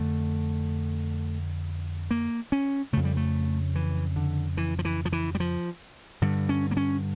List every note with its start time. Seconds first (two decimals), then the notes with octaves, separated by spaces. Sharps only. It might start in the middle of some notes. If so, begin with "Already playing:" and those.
Already playing: F2 D3 A3
2.11 A#3
2.52 C#4
2.93 F2 C#3 A3
3.05 G3
3.17 A3
3.75 E3
4.16 D3
4.57 E3
4.79 F3
4.85 E3
5.05 F3
5.13 E3
5.35 G3
5.40 F3
6.22 G2 D3
6.49 C#4
6.71 A#3
6.77 C#4